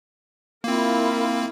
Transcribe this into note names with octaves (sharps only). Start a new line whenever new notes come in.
A#3 C4 E4 F4 A#4